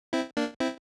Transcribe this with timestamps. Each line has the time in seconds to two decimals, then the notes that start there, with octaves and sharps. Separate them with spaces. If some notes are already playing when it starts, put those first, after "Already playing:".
0.13 C4 E4
0.37 A#3 D4
0.60 C4 E4